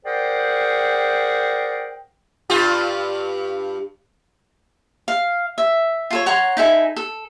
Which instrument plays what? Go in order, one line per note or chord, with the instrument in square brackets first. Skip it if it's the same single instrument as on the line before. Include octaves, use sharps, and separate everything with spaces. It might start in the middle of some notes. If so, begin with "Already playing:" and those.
[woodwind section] G#4 A#4 C5 D5 F#5 G5
[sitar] G2 F4 G4
[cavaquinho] F5
E5
F4 A4 C#5
C#5 F#5 A#5 C6
D#4 E4 A4 G#5
A4